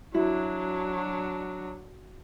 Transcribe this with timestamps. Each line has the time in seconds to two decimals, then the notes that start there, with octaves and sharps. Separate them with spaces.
0.14 F#3 D4 E4 F#4